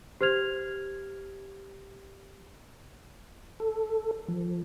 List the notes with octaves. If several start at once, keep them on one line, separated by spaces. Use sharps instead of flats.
G4 C5 F6 G#6 F7
A4
F3